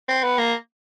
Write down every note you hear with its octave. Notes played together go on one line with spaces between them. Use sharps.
C4
B3
A#3